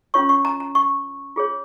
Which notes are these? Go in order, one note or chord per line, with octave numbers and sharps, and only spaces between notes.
C#4 F4 C#5 C#6
C#6
A#5
A#5
C#6
F4 G#4 C#5